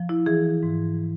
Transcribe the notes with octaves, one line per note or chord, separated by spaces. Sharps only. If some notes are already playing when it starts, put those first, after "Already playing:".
Already playing: F3
E4
E3 G#4
G#2